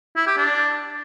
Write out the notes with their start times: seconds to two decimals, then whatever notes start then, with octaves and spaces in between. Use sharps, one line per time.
0.16 E4
0.27 G4
0.37 D4